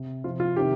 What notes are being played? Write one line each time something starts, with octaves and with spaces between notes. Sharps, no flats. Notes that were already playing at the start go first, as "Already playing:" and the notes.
Already playing: C3
C3 F3 F4
F4
C3 D#3 G4